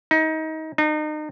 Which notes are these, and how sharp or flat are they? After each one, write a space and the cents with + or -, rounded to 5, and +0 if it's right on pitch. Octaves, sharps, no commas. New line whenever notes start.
D#4 +25
D#4 -35